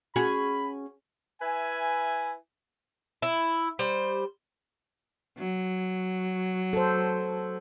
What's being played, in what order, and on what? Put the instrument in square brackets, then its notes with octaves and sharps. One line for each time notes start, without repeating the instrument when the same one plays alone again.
[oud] C#4 F#4 G#4 [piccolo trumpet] B5
[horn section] E4 B4 E5 G#5
[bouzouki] E4
G3 C5
[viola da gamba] F#3
[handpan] A4 C5